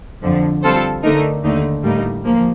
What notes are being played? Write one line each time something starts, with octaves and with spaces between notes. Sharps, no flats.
F2 D3 F3
G3 C4 F4 A4 C5
D3 A3 D#4 A#4
D#2 D3 A3 D#4
A2 G3 A#3 D#4
F3 A#3